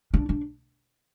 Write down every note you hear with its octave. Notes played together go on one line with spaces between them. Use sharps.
D4
D4